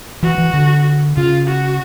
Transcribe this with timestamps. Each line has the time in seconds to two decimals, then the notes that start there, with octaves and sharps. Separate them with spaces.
0.23 E3 F#4
0.38 E3
0.53 D3
1.16 C#3 F4
1.47 F#4